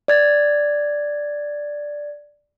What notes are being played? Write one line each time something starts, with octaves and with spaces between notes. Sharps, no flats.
D5 G#6 A6